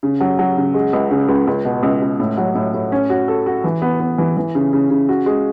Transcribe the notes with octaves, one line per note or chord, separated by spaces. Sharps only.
C#3
F#3
F#3
C#3
G#3
C#2
C#3
C#2
C#2
B2
C#2
C#2
A2
F#3
A2
A2
C#4
F#4
A4
F#4
E3
B3
B3
E3
E3
C#3
C#3
C#3
F#4
G#3